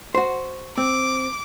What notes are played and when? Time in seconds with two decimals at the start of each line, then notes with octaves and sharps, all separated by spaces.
0.15 F#4 C5
0.78 C4 D6